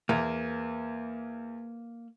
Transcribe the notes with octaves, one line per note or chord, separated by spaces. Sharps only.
E2 A#3